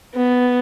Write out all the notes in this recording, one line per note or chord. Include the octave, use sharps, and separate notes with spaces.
B3